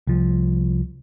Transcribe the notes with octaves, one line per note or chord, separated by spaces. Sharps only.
C2 F3